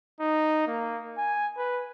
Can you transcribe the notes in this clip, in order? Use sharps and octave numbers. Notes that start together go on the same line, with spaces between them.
D#4
A#3
G#5
B4